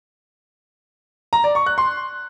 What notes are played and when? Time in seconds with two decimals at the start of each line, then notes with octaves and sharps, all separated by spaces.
1.33 A#5
1.44 D5
1.55 C#6
1.66 F#6
1.78 C6